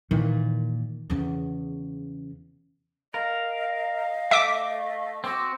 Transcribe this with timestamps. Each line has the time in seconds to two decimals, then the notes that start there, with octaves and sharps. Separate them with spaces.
0.11 A#2 D#3 E3
1.10 E2 C#3
3.14 A#4 D#5 F5
4.31 A3 E5 D6
5.24 C4 F#4 D6 E6